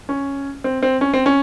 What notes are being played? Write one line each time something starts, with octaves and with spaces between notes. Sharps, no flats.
C#4
C4
C4
C#4
C4
C#4